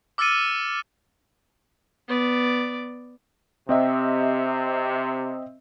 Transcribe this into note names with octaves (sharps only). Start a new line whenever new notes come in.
D6 E6 F6 A6 C#7 D#7
B3 D5
C3 C4 D#5 E5